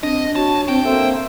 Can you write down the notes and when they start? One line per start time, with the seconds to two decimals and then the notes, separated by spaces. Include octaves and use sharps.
0.03 C4 D4 D#5
0.36 F#4 C#5 A5
0.68 C4 D4 G5
0.85 A#3 C4 A4 C5 E5